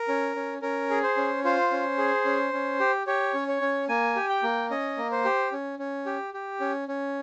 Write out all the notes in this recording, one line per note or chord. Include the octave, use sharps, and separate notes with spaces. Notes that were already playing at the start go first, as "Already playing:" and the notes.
Already playing: A#4
C#4
C#4
C#4 A#4
G#4
C5
C#4
F4 C5
C#4
G#4
C#4
C#4
G4
G4 C#5
C#4
C#5
C#4
A#3 G#5
G4
G5
A#3
C#4 D#5
A#3
C5
G4
C#4
C#4
G4
G4
C#4
C#4